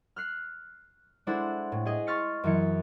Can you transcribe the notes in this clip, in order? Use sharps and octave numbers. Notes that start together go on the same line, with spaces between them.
F6 F#6 C7
G#3 D4 E4 A4 C5 F#5
A2
G#4 D#5
C6 C#6 F6 A6 B6 C#7
F#2 E3 C#7